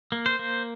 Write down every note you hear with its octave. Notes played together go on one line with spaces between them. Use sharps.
A#3
C5
A#3